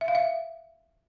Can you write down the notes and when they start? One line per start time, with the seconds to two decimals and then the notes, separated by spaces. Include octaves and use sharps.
0.01 E5
0.08 F5
0.15 E5